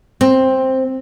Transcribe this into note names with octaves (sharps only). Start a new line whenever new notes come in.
C4